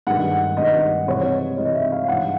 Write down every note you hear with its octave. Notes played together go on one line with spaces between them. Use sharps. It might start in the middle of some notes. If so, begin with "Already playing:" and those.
G2 D#3 G#3 F#5
G2 D#3 G#3 D#5
C3 E3 G#3 C#5
C3 E3 G#3 D#5
E5
F5
G2 E3 G#3 F#5